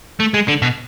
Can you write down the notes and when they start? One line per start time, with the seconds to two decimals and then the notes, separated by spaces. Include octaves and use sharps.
0.20 A3
0.34 G#3
0.48 D3
0.62 B2